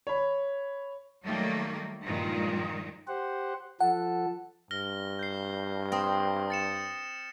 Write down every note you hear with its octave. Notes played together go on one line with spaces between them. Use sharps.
C#5 B5
D#3 F#3 G3 A3 A#3
G2 A#2 D#3 F3 G#3
G4 C5 F#5
F3 A4 F#5
G2 F6 A#6 G7
G6 C7
C4 D#6 A#6
A6 C#7 E7